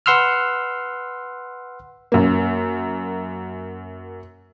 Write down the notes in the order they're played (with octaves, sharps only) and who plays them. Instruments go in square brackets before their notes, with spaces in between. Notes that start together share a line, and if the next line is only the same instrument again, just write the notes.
[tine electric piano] B4 F#5 C6 E6 F6
[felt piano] F#2 A#3